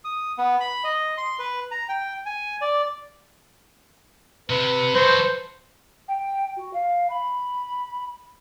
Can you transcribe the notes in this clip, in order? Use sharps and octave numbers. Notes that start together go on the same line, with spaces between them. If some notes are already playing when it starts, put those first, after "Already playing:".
D#6
B3
B5
D#5
C6
B4
A#5
G5
G#5
D5
C3 B4
F#3 A4 C5
G5
F#4
F5
B5